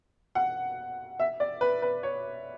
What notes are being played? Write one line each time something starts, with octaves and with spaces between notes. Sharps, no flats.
F#5
E5
D5
B4
B4
C#5